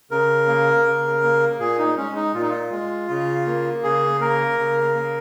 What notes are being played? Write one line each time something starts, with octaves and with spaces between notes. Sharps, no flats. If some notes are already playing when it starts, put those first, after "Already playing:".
C#3 A#4
A#3
C#3
A#3
A#2 G#4
D#4
G#3 C#4
D#4
A#2 F4
D#4
F4
G#3
C#3
A#3
C#3 G#4
A#3 A#4
C#3
A#3